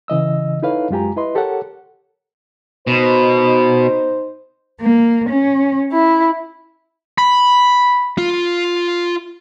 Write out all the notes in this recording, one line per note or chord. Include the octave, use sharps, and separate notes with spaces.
C#3 E3 D#5 E6
D#4 E4 A4 B4 C#5 F5
F#2 G#3 F4 G4 G#5 A#5
E4 B4 D#5 C6
G4 A4 A#4 C#5 F#5
B2 D#4 C5
A#3
C#4
E4
B5
F4